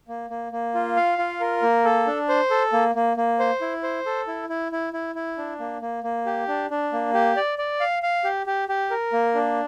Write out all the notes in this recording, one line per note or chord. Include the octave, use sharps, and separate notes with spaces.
A#3
A#3
A#3
F4
F5
F4
A#4
A#3
A4
D4
C5
A4
A#3
A#3
A#3
C5
E4
C5
A4
E4
E4
E4
E4
E4
D4
A#3
A#3
A#3
G4
D4
D4
A#3
G4
D5
D5
F5
F5
G4
G4
G4
A#4
A#3
D4